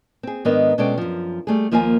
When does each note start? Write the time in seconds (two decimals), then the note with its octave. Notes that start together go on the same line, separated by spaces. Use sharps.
0.23 C4 G#4
0.45 G#2 D#3 B3 D4 A#4 D#5
0.78 B2 G#3 C#4 A4 D5 G5
0.98 F#2 F3
1.47 G3 A3 G#4
1.72 D#2 F3 A#3 F4 A#4 G#5